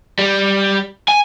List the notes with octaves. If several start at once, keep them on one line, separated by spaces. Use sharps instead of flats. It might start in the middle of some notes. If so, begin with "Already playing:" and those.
G3
G#5